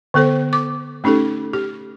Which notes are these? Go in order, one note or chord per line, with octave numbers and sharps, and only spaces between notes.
D3 B3 A4 C5
D6
A3 C#4 D#4 G4 A4
G4